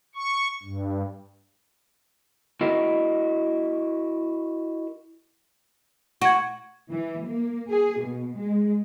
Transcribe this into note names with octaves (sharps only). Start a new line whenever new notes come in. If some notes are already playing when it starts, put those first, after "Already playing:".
C#6
G2
E4 F#4 A#4 D#5
F#4 C#6 G#6
E3
A#3
G#4
B2
G#3